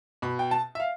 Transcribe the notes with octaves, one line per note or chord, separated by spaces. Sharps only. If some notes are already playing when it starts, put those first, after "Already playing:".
B2 B5
G5
A5
E5
F5